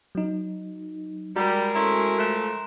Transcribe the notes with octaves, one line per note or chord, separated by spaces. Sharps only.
F#3 D#4
G3 G#3 F#4 A#4 A#5 G6
A3 C#4 E4 A#5 C6
F3 A3 F#6 E7